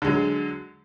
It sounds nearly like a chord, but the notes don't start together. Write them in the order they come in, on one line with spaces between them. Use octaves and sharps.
D3 G#3 F#3